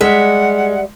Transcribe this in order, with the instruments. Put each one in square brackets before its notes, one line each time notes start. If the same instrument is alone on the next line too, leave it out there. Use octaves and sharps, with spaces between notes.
[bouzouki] G3 E5 [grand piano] G#3 [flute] F#5